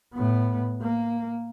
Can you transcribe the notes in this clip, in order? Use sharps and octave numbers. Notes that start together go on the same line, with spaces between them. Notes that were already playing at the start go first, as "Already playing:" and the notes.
A2 B3
A#3